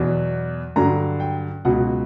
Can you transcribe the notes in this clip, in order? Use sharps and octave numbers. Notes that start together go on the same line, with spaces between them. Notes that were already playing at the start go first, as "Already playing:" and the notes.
Already playing: E2 B2 F#3
G2 D3 F#3 A#5
G5
C#2 B2 F#3 F#5